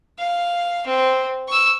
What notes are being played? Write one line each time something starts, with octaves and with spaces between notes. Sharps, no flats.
F5
C4
C#6 E6